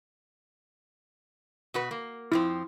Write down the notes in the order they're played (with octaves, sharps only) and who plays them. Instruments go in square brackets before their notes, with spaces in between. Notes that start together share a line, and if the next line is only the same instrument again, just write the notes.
[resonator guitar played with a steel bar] B2 F#4 B4
A#3
[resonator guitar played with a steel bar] F2 F3 C4 [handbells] E4